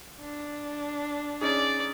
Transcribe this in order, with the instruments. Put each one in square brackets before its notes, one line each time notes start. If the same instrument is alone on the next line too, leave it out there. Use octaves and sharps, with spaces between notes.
[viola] D4
[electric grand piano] C#4 D#4 G#4 [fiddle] D5